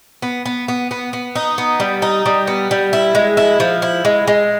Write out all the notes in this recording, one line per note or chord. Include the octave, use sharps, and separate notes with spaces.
B3
B3
B3
B3
B3
D#4
B3
G3
D#4
G3
B3
G3
E4
G#3
E4
F3
E4
G#3
G#3